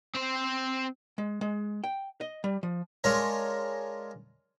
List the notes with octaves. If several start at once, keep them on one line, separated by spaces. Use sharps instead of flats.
C4 C5
G#3
G#3
G5
D#5
G3
F3
G#3 D4 F4 A#4 C#5